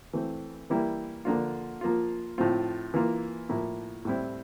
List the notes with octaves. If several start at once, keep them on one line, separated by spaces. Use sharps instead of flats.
E3 A3 C4
E3 G3 A#3 E4
D3 F3 A#3 D4 F4
F3 A#3 F4
A2 F3 C4 F4
E3 A#3 F4
A2 F3 A#3 E4
A2 G3 C4 E4